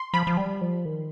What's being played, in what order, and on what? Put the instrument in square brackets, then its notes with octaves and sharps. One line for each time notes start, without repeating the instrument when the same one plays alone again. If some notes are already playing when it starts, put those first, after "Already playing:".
Already playing: [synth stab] C6
[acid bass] F3 [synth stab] B5
[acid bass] F3
G3
F3
D#3